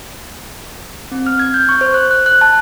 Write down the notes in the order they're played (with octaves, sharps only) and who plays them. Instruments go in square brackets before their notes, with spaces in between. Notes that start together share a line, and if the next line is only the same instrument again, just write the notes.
[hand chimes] C4
F6
G#6
G6
C#6
C5
F#6
F#6
F#6
A5